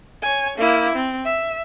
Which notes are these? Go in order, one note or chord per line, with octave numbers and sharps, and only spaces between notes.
C#5 G#5
A#3 E4
C4
E5